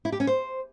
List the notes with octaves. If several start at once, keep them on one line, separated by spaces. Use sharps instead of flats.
E4
G4
C#4
C5